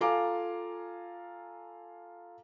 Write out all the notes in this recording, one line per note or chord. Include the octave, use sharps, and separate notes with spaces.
F4 A4 F5 G#5 A#5 D6